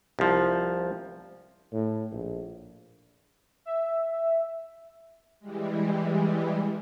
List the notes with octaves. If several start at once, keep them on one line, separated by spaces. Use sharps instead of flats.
C2 F3
A2
A#1
E5
E3 G3 G#3